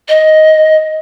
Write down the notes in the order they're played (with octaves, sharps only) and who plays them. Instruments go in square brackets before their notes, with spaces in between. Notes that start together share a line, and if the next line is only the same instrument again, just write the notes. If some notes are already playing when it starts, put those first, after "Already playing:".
[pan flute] D#5